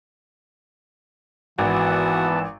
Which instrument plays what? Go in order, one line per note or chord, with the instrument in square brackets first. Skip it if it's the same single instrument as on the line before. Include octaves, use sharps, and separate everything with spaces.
[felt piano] G#1 [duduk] E3 [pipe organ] B3 A5 [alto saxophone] F#4